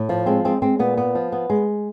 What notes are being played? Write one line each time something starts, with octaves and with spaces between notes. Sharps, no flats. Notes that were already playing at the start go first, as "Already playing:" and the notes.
Already playing: A2
F3
G#3 C4
G#3 C4
G#3 C4
A#2 B3
B3
F3
B3
G#3